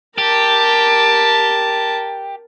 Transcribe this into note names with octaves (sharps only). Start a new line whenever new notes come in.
G4 A#4 A5